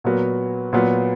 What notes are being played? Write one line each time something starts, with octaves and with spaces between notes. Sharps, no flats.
A#2 F#3 B3 F#4 A#4
A#2 F#3 B3 F4